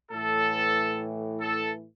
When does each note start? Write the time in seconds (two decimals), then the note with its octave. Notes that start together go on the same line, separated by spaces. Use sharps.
0.11 A2 E3 A4
1.41 A4